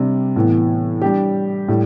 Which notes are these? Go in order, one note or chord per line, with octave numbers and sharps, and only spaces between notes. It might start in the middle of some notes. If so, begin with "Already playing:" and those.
Already playing: C3 G3 D4
A2 E3 B3
G3 D4 G4
A2 G3